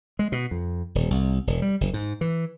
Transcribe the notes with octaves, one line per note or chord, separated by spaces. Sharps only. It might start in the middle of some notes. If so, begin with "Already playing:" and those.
G#3
B2
F2
D#1
C2
E1
G3
F#1
G#2
E3